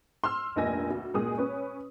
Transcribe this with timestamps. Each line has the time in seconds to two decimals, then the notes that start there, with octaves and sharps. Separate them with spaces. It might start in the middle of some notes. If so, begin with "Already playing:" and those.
0.24 C6 E6 F6
0.56 F1 A#1 A#2 D#5 G#5 A#6
0.90 D2
1.14 C#2 A#2 G#3 G#4 D#6
1.38 C#4 B4 C#5